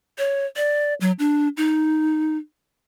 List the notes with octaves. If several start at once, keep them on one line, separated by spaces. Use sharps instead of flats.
C#5
D5
F#3
D4
D#4